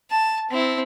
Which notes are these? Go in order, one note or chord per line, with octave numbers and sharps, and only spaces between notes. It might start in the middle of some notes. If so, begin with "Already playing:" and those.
A5
C4 E4